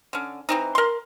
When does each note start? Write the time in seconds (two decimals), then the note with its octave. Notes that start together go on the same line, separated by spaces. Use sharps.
0.13 D3 C#4
0.49 E3 C4 D#4
0.75 A#4 C6